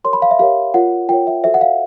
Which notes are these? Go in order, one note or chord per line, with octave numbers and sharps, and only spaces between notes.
G4 A#4 C#5 C6
B5
F5
E5
G4 A#4 C#5 F5
F4 A#4 C#5 F#5
F4 A#4 C#5 G5
E5
F#4 A4 C5 E5
F#5
F5